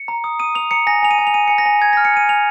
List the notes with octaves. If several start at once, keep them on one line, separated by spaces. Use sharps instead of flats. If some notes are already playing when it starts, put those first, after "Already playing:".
Already playing: C#7
A#5
D#6
D#6 D#7
D#6 F7
A#5 C#7
G#5 A#6
G#5 F7
D#7
G#5
F7
G#5 D#7
G#5 C#7
A#6
G#5
G#5 G#6
F6 A#6
C#7
G#5 D#7
G#5 F7